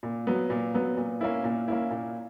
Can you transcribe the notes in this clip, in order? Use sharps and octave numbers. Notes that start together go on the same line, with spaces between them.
A#2
F#3 B3
A#2
F#3 B3
A#2
A#3 C#4 E4
A#2
A#3 C#4 E4
A#2